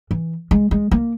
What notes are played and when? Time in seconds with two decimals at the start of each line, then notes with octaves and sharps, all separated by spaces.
0.11 E3
0.51 G#3
0.71 G#3
0.91 A#3